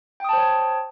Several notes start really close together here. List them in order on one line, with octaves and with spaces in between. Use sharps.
G5 D#6 A5 C5 C#5